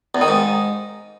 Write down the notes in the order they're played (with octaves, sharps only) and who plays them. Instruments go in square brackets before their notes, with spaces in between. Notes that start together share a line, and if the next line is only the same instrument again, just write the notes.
[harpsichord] E2
D#3
G#2